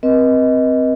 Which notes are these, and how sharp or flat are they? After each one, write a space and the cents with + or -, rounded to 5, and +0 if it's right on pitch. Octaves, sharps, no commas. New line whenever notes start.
C4 -5 B4 -45 D#5 +15